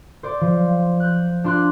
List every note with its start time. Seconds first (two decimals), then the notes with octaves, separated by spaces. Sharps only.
0.23 C5 D5
0.41 F3
1.00 F#6 G6
1.44 D4 F4 C6 D6 F#6